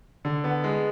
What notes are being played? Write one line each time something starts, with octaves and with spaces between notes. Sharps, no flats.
D3
B3
G#3